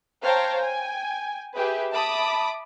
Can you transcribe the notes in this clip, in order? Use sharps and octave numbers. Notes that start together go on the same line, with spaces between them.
C5 C#5 F5 G5 A5 A#5
G5 G#5
G4 G#4 B4 E5 G5
E5 A5 B5 D6 D#6